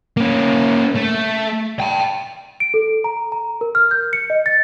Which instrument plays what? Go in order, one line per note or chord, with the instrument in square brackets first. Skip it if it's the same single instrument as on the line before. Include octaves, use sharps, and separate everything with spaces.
[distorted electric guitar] A#3 C#4
A3
G5 A5
[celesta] D7
A4
A#5
A#5
A#4
F6
G6
C#7
D#5
A6